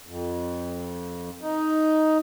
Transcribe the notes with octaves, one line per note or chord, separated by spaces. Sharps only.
F2
D#4